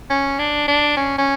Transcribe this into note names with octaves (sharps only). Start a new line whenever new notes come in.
C#4
D4
D4
C#4
C#4